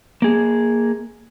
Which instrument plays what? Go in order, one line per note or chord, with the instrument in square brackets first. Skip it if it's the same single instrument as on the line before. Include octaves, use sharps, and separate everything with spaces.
[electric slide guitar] A#3 G#4